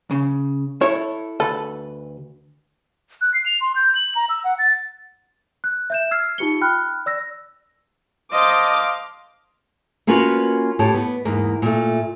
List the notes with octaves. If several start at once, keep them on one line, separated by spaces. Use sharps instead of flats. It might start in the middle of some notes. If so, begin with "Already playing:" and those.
C#3
E4 A4 C#5
D2 A4 B4
F#6
C7
F7
C6
G6
F#7
A#5
E6
F#5
A6
F#6
E5 G6 E7
E6 F6 G#6 C7
D#4 F4 G4 C#7 G7
G5 B5 F6 F#6
D5 E6 A#6
C5 D#5 F5 A5 D6
A#3 C#4 F4 F#4 A#4 B4
A2 G4 C#5 A5
B3
E2 G#2 A#3
A#2 A3